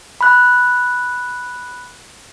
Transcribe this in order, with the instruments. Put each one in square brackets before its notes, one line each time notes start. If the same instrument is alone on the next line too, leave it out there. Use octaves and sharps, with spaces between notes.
[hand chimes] B5 F#6